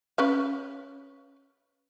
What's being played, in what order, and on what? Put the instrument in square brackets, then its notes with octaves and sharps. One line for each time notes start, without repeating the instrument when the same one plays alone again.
[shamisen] C#4 B4 F5